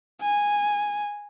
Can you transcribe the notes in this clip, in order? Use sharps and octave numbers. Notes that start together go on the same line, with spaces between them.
G#5